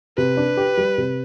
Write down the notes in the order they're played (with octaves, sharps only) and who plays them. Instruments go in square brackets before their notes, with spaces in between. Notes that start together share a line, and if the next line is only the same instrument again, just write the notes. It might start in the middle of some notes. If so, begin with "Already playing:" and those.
[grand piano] C3 [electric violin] B4
[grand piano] D4
G4
G3
C3